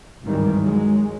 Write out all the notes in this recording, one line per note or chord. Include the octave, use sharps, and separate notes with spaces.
G#1 C#2 G2 D#3 E3 G3
F#3 G#3